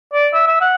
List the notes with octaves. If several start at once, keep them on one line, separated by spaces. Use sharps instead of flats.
D5
E5
E5
F#5